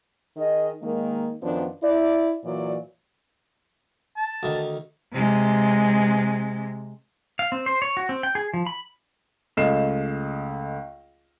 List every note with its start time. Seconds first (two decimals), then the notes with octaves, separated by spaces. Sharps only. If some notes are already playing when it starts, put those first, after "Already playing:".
0.37 D#3 G#4 D#5
0.82 D#3 G#3 A#3
1.43 F#2 D#3 F3 B3 D4
1.83 E4 D5
2.44 A#2 E3 F#3 D5
4.16 A5
4.43 D2 D#3
5.14 C3 G#3
7.39 F5
7.52 C4
7.66 C5
7.82 C#5
7.97 F#4
8.09 C4
8.23 G5
8.35 G#4
8.54 F3
8.66 B5
9.57 C#2 A3 D#5 F6 C7 E7